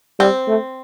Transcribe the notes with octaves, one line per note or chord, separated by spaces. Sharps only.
G3 C4
A3